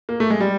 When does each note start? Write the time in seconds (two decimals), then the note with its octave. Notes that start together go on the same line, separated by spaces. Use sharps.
0.09 A#3
0.20 A3
0.30 G#3
0.40 G3